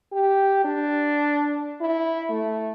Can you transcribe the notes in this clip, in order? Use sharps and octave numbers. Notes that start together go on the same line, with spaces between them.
G4
D4
E4
A3